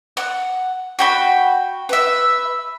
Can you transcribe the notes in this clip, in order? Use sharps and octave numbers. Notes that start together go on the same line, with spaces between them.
F#5
F#4 G5 B5
B4 E5